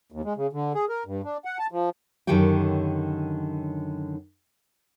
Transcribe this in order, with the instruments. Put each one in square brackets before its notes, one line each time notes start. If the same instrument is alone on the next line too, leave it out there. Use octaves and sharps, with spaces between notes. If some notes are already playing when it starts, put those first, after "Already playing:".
[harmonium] D#2
G#3
C#3
D3
G#4
A#4
G2
D4
F#5
A5
F3
[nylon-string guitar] F#2 D3 D#3 G4 C#5 G5